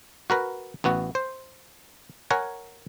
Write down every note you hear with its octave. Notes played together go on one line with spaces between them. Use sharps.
F#4 A#4 B4
A1 B3 F#4
C5
A#4 C#5 F#5 G#5